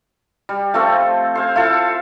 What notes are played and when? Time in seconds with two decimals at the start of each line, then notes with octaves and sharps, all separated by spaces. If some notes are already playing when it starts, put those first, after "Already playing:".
0.49 G3
0.74 F3 A3 C4 A4
1.35 C5 F5 G#5
1.56 E4 F4 A4 F5